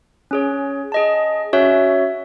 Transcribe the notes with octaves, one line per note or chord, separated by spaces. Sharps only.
C#4 G#4 C#5
G#4 D#5 A5
C#4 F#4 C#5 E5